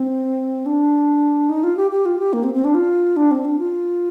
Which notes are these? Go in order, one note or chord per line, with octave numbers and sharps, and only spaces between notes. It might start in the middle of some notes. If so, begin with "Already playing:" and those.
Already playing: C4
D4
D#4
F4
G4
G4
F4
G4
A#3
C4
C4
D4
F4
D4
C4
D4
F4